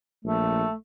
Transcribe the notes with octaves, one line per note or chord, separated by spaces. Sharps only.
A#1 A3